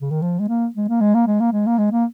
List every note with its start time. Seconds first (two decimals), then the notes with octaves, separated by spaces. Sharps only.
0.01 C#3
0.11 D#3
0.22 F3
0.39 G#3
0.48 A#3
0.76 G#3
0.89 A#3
1.00 G#3
1.15 A#3
1.27 G#3
1.40 A#3
1.53 G#3
1.66 A#3
1.78 G#3
1.92 A#3